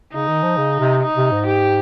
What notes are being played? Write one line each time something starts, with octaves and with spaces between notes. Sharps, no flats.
C#3 D#4
D#3
F3
C#3
C3
D#4
C3
G#2
G4